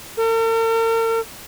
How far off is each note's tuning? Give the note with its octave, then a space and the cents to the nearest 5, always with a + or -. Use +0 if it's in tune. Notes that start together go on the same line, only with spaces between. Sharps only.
A#4 -45